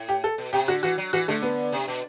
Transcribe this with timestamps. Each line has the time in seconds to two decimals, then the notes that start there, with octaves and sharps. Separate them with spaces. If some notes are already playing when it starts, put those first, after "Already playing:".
Already playing: A2
0.09 G4
0.24 A4
0.38 B2
0.53 C3 G4
0.68 D3 F#4
0.83 E3 F#4
0.98 F#3
1.13 E3 F#4
1.28 D3 A3
1.42 B3
1.73 C3
1.88 B2